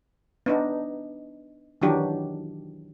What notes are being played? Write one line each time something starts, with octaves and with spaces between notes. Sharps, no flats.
B3 D4 D#4
D#3 E3 F#3 D4 G4